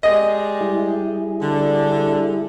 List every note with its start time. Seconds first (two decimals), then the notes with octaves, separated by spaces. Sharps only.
0.03 G#3 G4 D5 D#5
0.61 G3 E4 G#4
1.41 D3